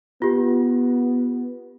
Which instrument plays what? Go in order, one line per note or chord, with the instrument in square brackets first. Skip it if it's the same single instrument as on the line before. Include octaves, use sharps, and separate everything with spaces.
[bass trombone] B3 [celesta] F4 G4